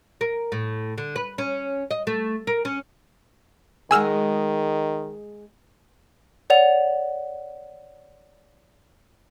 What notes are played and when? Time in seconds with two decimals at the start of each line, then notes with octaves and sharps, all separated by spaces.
0.21 A#4
0.52 A2
0.98 D3
1.16 B4
1.38 C#4
1.91 D#5
2.07 A3
2.47 A#4
2.65 C#4
3.91 D#3 G#3 F#4 G#4 G#5 E6 F6
6.50 C#5 D5 F#5 F7